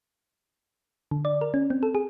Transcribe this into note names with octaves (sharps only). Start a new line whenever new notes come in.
D3
D5
A#4
C#4
C4
A4
G#4